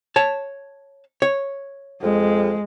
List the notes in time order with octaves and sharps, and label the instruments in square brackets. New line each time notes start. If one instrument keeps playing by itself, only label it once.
[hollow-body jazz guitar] C#5 A5
C#5
[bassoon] F2 [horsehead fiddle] G#3